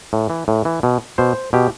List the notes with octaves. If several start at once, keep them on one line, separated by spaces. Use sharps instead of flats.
A2
E3
A2
E3
B2
B2 C5
B2 G4